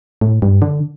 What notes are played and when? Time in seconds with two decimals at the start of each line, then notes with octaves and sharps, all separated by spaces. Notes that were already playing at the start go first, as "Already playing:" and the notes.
0.21 A2
0.42 G2
0.62 D3